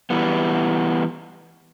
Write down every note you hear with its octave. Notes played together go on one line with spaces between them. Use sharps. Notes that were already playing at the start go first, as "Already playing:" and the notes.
E3 G3 B3